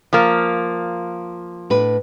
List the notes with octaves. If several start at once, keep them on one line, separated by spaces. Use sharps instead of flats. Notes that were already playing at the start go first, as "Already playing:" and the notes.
F3 A#3
A2 D4 B4